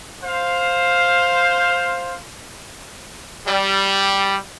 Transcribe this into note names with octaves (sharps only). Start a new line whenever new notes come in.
C5 F5
G3